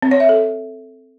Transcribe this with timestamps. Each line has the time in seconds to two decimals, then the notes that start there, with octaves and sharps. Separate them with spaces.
0.02 C4
0.11 C#5
0.20 E5
0.29 A4